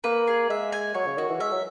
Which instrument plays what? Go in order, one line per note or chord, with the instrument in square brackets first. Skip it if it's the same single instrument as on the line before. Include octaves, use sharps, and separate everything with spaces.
[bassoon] A#3 [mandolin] B4
[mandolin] G#4
[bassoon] G#3 [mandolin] E5
[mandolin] G#5
[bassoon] F#3 [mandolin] C#5
[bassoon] C#3
[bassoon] D#3 [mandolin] F#4
[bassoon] E3
[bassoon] G#3 [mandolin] E5
[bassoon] F#3